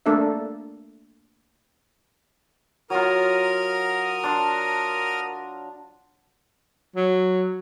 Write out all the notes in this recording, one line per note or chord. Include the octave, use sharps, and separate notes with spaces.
A3 A#3 D4 A4 A#4 E5
F#3 F4 A#4 D#6 F6
D4 C6
F#3